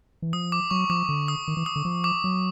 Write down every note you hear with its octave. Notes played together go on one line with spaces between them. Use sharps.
E3
F3 D#6
D6
F#3 C#6
F3 D6
D3
D#6
D#3
E3
D#6
D3
F3
D6
F#3